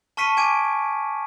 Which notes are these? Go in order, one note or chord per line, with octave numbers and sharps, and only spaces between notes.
A5 C#6 F6 B6 C#7 D#7
G#5 D6 G#6 D7 D#7